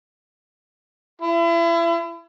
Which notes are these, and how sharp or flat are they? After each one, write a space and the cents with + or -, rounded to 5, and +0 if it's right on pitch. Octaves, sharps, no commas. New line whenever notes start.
E4 +35